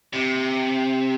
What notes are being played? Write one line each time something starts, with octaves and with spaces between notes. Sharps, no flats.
C3